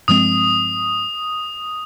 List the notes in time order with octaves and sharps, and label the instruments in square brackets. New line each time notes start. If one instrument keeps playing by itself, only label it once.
[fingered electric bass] G2 F3 G#3 C4 [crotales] D#6